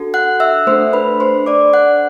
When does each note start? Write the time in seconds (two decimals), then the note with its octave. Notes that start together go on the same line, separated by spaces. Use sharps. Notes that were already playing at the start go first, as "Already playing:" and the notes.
Already playing: D4 F#4 A4
0.14 F#5 F#6
0.40 E5 E6
0.67 A3 D4 A4 C5 C6
0.93 B4 B5
1.20 C5 C6
1.46 D4 A4 D5 D6
1.73 F#5 F#6